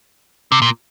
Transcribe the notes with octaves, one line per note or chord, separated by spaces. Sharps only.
C3
A#2